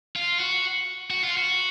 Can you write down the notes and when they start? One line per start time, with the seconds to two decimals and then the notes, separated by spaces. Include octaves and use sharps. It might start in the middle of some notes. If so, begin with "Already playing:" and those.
0.16 F4
0.40 F#4
1.10 F#4
1.24 F4
1.37 F#4